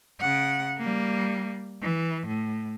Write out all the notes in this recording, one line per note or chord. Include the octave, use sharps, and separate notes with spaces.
C#3 F#5
G3 A#3
E3
A2